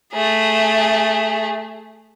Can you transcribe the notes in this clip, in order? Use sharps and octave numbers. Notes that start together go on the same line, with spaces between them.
A3 G#4